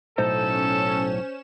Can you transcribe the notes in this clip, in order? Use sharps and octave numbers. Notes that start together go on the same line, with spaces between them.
B1 A2 C#4 D#4 A4 C5 E7